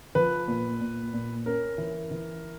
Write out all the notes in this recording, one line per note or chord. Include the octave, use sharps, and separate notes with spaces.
F3 B4
A#2
A#2
A#2
C#4 A#4
E3
E3